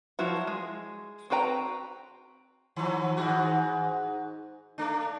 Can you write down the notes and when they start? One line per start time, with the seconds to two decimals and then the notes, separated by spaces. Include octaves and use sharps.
0.19 F3 F#3 E4 F#4
0.47 G#3
1.30 C4 F#4 B4 G5 A#5
2.76 D#3 F3
3.17 G#2 D#3 F#4
4.78 A3 D4